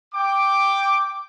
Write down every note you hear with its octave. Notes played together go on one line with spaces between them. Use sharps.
G5 D6